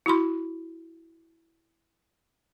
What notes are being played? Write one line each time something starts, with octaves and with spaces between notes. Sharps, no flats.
E4 F#4 B5 C6